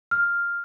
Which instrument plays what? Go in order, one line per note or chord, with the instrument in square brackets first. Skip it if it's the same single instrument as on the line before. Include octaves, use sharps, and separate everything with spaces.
[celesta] F6